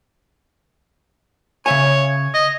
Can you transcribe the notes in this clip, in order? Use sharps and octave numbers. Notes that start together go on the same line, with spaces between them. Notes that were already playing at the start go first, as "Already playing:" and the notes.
C#3 C#5 E5 G#5
D#5